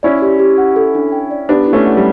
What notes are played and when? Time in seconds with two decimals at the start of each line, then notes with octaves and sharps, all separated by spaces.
0.03 C#4 E4 D5
0.22 G4
0.39 G4
0.58 F#5
0.76 A4
0.95 D4
1.12 G5
1.31 D5
1.49 B3 D4 G4
1.67 E4
1.73 A3 C#4
1.85 F#5
1.97 G3